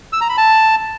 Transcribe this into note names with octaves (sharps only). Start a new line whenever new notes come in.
E6
A#5
B5
A5